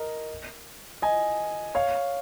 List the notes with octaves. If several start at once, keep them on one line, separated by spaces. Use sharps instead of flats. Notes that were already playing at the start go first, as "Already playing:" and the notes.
Already playing: A#4 D#5
D#5 G#5
C#5 F5